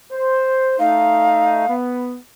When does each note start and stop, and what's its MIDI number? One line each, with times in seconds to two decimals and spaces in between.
0.12 0.78 72
0.79 1.64 57
0.79 1.64 63
0.79 1.74 77
1.69 2.15 59